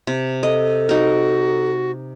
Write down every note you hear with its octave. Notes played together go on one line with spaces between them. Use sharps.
C3
A4 D#5
D#4 F#4 A#4